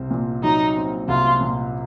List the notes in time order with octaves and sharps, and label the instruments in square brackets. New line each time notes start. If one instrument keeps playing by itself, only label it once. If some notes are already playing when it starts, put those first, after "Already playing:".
Already playing: [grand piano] C2 C4
A#2
[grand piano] F#3 [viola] D#4
[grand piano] C4
[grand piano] C2 [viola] F4
[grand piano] A#2